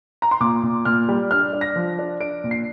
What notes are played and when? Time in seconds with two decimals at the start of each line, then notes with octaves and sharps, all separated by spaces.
0.22 A#5
0.31 C6
0.40 A#2 D6
0.63 A#2
0.85 A#2 F6
1.09 G3
1.31 D4 F6
1.53 D4
1.61 A#6
1.76 F3
1.99 D4
2.20 D4 D7
2.44 A#2
2.51 C7